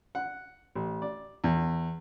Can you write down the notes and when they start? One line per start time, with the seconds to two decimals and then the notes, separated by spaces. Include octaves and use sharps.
0.15 F#5
0.75 A1
1.02 D5
1.44 E2